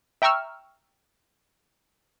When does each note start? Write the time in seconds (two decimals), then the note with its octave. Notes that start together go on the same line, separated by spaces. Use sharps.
0.22 E5 G5 A#5 C#6 E6 F6